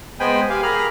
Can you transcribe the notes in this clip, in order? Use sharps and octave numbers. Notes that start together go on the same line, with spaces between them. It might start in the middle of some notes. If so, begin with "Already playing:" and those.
G#3 B3 C5 G5 G#5 B5
G4 F5 G#5
G#4 A#4 B5 F6